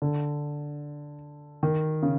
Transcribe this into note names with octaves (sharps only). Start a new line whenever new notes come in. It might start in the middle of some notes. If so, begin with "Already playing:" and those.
D3
D#3
C#3